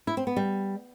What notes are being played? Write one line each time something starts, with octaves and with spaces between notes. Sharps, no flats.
E4
C4
B3
G3